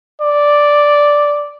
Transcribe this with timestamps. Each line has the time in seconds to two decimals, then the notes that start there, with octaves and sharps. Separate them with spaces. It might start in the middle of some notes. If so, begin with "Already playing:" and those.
0.22 D5